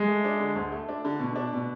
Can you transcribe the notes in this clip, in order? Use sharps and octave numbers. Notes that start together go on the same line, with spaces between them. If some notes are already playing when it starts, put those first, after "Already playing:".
Already playing: G#3
A3
D4
D3
D2
A3
D4
D3
B2
D4
B2